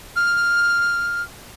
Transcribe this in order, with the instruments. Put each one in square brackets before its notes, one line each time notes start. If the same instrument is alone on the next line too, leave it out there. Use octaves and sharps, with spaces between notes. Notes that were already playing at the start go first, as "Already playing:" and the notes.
[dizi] F6